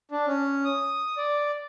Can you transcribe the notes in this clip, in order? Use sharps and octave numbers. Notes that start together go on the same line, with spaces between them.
D4
C#4
D#6
D5